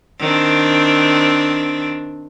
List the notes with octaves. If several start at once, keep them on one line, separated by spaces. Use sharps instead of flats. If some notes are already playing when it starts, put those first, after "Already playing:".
D#3 C4 D4